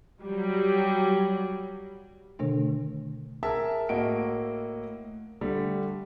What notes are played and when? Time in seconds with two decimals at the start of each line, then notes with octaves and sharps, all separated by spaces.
0.23 F#3 G3
2.39 B2 D3 D#3 A3 D4 A#4
3.43 G#4 A#4 E5 A5 E6
3.89 A2 A#3 F#4 D#5 D7
5.41 D3 G3 A3